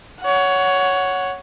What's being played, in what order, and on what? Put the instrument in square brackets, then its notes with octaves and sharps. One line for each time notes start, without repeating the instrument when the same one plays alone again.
[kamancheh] C#5 F#5